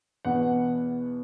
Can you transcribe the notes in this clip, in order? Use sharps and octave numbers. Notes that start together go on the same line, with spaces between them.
E2 B2 B3 F#5